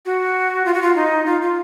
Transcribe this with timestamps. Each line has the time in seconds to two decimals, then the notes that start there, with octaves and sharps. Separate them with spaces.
0.06 F#4
0.66 F4
0.74 F#4
0.82 F4
0.96 D#4
1.26 F4
1.42 F4